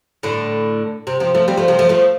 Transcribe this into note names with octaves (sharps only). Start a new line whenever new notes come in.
A2 D3
C3
C3 F3
F3 A3
G3 C4
F3 A3
C3 F3
F3 A3
F3 A3